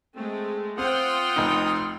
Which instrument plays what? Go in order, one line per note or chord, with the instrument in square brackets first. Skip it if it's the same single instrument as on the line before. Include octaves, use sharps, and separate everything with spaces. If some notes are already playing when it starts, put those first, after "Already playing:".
[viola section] G#3 A3 [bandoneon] C4
[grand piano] C4 [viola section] F4 F#5 G5 [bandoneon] C6 D#6 F6
[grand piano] F1 D#4